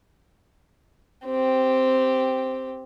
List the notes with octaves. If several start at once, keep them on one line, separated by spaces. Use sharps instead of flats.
C4 G4